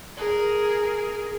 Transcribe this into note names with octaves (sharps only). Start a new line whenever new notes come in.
G#4 A#4